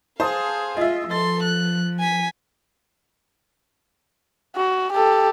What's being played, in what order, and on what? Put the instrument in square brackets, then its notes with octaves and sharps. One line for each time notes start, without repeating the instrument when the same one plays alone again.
[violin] G#4 F5 [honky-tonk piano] C5 A5 D#6
[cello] F4 [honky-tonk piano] D#5 E5
[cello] F3 [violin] A4 C6 [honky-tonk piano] A6
[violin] F#6
G#5 B6
[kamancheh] F#4
G4 A4